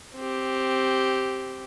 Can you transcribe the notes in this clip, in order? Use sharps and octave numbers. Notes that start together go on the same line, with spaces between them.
C4 G4